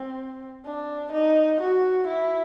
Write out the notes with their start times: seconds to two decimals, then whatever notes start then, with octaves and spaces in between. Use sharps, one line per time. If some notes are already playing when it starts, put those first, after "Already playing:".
Already playing: C4
0.66 D4
1.12 D#4
1.61 F#4
2.08 E4